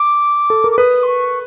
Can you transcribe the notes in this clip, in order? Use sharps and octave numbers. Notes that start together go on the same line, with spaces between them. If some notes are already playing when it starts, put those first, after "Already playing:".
Already playing: D6
A4
A#4
D6
B4 D#6
C6
C#6